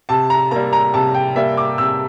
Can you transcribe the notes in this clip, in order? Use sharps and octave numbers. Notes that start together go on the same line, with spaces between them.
C3 A5
A#5
G3 A#3 A#5
A#5
C3 A5
G5
G3 A#3 E5
D6
C3 E6